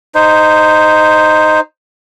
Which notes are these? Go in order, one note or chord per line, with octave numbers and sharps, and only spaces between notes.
D#4 C5